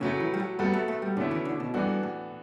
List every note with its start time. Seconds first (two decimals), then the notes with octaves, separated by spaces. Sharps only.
0.01 A2 C#3 F#3 A3
0.20 E3
0.34 G3
0.40 F#3
0.59 F#3 G3 B3 F#4 A4
0.73 A3
0.88 A3
1.02 G3
1.17 B2 D3 A3 C#4 E4
1.31 E3
1.45 D3
1.60 B2
1.74 G2 E3 B3 D4 F#4 A4
2.03 A2